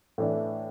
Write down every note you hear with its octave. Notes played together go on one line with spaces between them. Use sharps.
A2 E3 D4